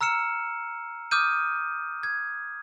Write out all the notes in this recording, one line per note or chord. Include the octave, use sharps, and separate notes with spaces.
A#5 E6 F6 C#7 E7
D6 D#6 F6 G6 D#7
G#6